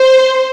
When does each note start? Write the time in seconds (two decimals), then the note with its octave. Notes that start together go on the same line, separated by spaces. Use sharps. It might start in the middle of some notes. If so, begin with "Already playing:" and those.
Already playing: C5